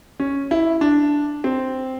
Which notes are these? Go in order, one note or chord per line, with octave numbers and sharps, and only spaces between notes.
C#4
E4
D4
C4